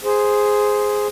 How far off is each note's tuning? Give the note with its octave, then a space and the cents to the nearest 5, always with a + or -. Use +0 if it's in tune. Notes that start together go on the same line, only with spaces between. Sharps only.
G#4 +0 C5 -5